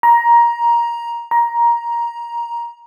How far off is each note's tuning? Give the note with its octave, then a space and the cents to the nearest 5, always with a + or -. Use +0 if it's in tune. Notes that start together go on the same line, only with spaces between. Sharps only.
A#5 +15
A#5 +15